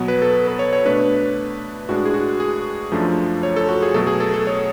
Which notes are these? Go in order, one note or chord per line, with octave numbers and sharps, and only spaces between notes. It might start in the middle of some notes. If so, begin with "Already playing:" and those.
Already playing: B2 F#3 B3
B4
A4
B4
C#5
C#5
B2 A3 D4 B4
A2 G#3 D4 F#4
G#4
F#4
G#4
F#2 F3 A3 D4
C#5
A4
F#4
G#4
B2 F#3 A3 A4
G#4
A4
A4
C#5